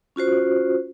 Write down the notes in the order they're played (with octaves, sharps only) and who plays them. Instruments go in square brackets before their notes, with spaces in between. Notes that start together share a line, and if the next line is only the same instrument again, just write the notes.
[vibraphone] C#4 F4 F#4 C5